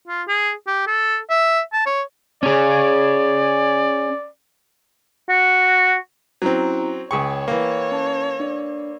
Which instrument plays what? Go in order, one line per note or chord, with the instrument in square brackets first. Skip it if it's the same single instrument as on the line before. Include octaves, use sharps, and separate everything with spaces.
[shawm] F4
G#4
G4
A4
E5
A5
C#5
[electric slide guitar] C#4 G#4 [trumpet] D5
[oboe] F#4
[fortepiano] F#3 C4 [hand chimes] C#4 E4 A#5
[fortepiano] C#2 G#4 C#6 [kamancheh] C#5 [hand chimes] G5
[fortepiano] E3 A#3
[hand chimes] C#4 A5
D4 D5